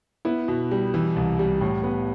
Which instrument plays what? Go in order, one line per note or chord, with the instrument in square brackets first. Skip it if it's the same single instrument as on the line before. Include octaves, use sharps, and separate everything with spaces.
[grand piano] B3 E4
B2
G3
E3
C2
G3
A2
B3